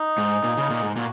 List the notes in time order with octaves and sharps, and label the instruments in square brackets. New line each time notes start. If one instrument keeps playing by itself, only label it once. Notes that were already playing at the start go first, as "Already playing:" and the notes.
Already playing: [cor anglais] D#4
[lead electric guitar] G#2
A#2
C#3
A#2
G#2
[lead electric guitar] A#2 [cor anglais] F#4